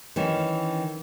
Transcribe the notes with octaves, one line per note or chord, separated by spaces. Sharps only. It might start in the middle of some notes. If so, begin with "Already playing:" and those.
D#3 E3 C#4